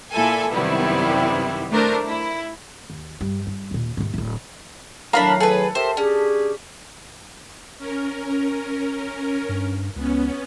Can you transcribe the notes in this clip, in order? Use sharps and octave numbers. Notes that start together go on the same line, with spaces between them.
A#2 E4 A4 G#5
F#2 C3 D#3 G3 B3 E4
A3 D4 A#4 C5
E4
D#2
G2 G3
G2
D#2 A#2
D#2 G#2
D1 G#1
A2 D#3 F#3 A#3 D4 F5 A#5 B5
G#4 A4 B4
G4 A#4 C5 E5
C#4 D4 G4 G#4
C#4 A#4
G2
C#2 B3 C#4